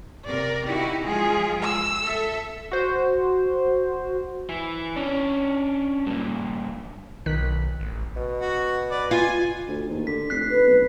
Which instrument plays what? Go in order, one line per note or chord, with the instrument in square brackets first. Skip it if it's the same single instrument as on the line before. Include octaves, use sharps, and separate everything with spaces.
[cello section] C3 A#4 [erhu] D5
[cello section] D#4 E4 F#4 [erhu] G4
[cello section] F3 G#3 F4 [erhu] G#4
[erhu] E6
[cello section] A4 E5
[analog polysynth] F#4 C5
[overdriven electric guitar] E3 E4
C#4 D4
G2 A#2
[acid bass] B1 [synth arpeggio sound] D#3 F#6 B6
[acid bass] A1
[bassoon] B2
[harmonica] F#4
B4 D5
[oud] F4 [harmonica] G#5
[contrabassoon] D2
D#2
[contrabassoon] D3 [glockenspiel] B6
[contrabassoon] F1 [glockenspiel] F#6 B6 C7
[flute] B4
[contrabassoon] B1